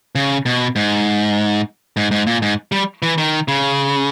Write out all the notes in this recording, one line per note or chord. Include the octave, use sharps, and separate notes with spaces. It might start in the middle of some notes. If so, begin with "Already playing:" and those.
C#3
B2
G#2
G#2
G#2
A#2
G#2
G3
E3
D#3
C#3